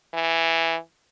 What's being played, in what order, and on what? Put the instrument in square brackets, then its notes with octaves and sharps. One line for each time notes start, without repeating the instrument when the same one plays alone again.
[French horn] E3